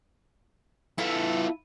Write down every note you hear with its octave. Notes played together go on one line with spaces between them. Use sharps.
B3 E4 F4 A4 E5